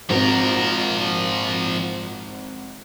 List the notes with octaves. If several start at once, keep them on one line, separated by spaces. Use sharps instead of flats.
G#1 F3 C4 A#4